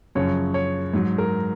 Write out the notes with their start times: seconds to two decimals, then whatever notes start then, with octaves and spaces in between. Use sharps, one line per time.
0.15 F#2 C#3 F3 C#5
0.54 C#5
0.93 G#2 F#3
1.18 A#4